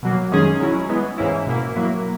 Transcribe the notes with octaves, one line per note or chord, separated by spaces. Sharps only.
B2 F#3 A#3
F#2 D#3 G#3 C#4 G#4
F#3 C#4 E4
E3 G#3 B3
G#2 E3 A#3 C#4 E4
B2 A#3 E4
F#3 A#3 E4